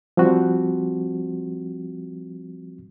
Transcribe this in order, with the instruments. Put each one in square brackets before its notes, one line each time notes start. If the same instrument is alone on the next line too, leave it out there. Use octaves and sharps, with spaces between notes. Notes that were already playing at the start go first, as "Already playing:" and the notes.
[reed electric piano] F3 G3 C4 F#4